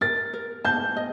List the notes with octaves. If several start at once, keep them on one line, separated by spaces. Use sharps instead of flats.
A#4 A6
A#4
A5 G6
D#5